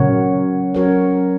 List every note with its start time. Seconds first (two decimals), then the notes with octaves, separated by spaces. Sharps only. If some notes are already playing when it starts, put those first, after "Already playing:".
Already playing: A#2 C#3 F#3 C#4 F#4 A#4 C#5
0.74 F#3 C#4 F#4 A#4 C#5